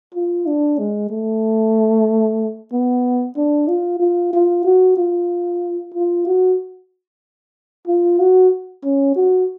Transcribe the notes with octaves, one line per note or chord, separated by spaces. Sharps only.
F4
D4
G#3
A3
B3
D4
F4
F4
F4
F#4
F4
F4
F#4
F4
F#4
C#4
F#4